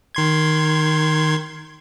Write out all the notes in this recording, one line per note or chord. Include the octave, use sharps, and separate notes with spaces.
D#3 C6 G#6